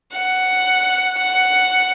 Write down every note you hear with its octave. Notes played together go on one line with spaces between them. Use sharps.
F#5
F#5